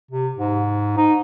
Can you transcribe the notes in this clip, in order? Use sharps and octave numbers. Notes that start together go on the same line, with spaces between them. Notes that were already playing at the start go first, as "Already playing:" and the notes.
C3
G#2
D#4